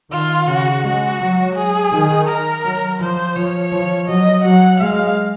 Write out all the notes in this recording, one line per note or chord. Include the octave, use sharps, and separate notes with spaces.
D#3 F4
C#3 F#4
G#3 F#4
F#3
G#4
D#3
A#4
F#3
F3 C5
F3 C#5
F3
F#3 D#5
F#3 F#5
G#3 F5